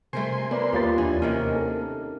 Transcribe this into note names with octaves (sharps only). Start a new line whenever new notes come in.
C3 G3 A3 A#4 C5 G#5 C6
B3 E4 A#4 B4 D5 C6
D#2 A#3 F4 G4 C#5 A6
E2 E3 D4 G#5
C3 D#3 A#3 C#4 A#4
A4